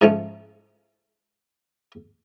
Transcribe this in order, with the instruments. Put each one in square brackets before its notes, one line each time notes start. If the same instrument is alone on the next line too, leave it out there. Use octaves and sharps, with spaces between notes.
[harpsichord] G#2 F3 A3 C#4